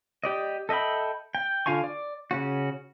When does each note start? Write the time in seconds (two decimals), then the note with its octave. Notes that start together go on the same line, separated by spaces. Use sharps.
0.24 G4 D5 D#5
0.69 A4 D#5 E5 G5 B5
1.35 G5
1.66 D3 F4 F5 G#5 C#6
1.84 D5
2.31 C#3 C#4 F#4